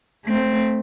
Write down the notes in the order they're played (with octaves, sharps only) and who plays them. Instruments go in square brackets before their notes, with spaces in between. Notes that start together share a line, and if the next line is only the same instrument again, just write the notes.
[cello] A3 C4